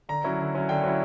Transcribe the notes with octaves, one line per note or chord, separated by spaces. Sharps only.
D3 A#5
F#3 C#4 E4
D3
F#3 C#4 E4
D3 G5
F#3 C#4 E4